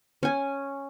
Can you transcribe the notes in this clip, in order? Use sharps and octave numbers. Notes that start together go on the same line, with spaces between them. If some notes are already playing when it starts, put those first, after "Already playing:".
C#4 G#5